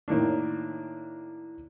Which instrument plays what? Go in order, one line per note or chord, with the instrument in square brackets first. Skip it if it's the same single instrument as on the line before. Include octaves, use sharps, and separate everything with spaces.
[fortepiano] A2 D#3 A#3 D4